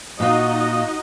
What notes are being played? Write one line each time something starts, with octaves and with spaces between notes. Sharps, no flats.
A#2 D#4 F4 F#4 D#5